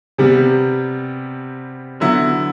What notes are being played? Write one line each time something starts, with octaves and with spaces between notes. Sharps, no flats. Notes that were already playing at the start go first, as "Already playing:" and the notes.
C3 G3 B3
D3 F#3 B3 E4